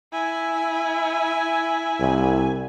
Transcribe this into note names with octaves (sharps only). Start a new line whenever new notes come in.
E4 G#5
C2